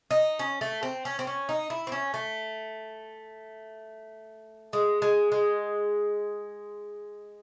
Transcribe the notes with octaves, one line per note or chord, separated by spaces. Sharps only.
D#4
C#4
A3
C4
C#4
C4
C#4
D#4
E4
C4
C#4
A3
G#3
G#3
G#3